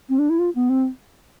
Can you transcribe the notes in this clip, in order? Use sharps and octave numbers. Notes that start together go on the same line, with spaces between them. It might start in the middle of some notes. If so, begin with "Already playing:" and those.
C4
D4
E4
F4
B3
C4